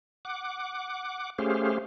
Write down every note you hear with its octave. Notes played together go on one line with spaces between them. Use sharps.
F#5 D6
A3 C#4 G4 G#4 C5 F5